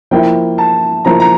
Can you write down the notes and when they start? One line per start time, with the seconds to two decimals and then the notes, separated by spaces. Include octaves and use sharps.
0.11 F3 A#3 E4 G5
0.58 A5
1.05 F3 A#3 E4 A#5
1.20 A#5